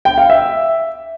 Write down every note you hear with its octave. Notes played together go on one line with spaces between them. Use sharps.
G5
F5
E5